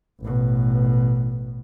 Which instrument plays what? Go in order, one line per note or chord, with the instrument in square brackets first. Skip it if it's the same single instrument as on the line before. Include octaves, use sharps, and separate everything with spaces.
[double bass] A1 B2